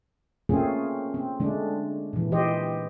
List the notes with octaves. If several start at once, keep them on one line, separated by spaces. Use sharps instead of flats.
A3 A#3 C4 C#4 F4 G#4
C4
D3 G#3 A3 D4
A#2 E3
E3 G4 C5 D#5